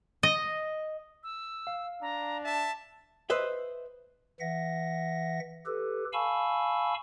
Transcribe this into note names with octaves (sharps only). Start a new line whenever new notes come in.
D#5
E6
F5
D4 A#5
E5 A5
B4 C5 D#5 E5
E3 E5 F#5 A#6
G4 A4 B4
F5 G#5 A5 B5 C#6 E6